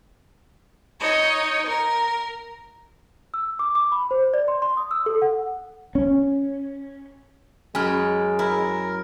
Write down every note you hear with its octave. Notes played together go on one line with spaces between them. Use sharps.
D#4 C#5 D#5
A#4
E6
D6
D6
B5
C5
D5
C6
C6
D#6
E6
A4
F#5
C#4
F#2 G#3 G#5 B5 F6
E4 A#4